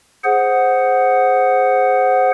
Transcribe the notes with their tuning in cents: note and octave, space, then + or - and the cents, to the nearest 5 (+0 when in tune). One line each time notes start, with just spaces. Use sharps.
G#4 +0 C5 +0 F#5 +0